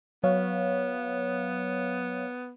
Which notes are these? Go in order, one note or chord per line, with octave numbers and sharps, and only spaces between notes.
F#3 B3 C#5 F5